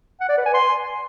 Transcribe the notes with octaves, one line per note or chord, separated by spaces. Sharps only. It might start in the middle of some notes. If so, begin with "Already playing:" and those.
F#5
D5
B4
G#5
C6